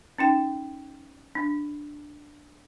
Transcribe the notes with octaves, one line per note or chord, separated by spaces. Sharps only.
C#4 D#4 G5
D4